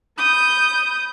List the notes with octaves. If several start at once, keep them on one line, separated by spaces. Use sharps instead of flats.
B5 D#6 G6